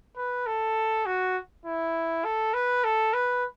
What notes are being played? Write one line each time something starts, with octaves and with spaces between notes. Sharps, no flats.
B4
A4
F#4
E4
A4
B4
A4
B4